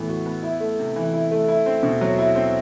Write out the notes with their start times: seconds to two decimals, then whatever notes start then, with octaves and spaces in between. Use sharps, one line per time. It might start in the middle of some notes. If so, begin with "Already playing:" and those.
Already playing: A2 E3 B3
0.09 F#4
0.26 B3
0.43 E4
0.60 A3
0.79 C3
0.96 E3
1.14 E4
1.31 A3
1.48 E4
1.66 C4
1.83 B2
2.01 F#3
2.19 E4
2.36 C4